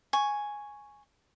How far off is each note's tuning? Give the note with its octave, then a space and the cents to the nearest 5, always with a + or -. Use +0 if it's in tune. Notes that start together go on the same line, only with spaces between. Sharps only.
G#5 +0 C#6 +0